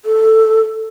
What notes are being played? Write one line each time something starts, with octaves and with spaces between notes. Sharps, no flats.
A4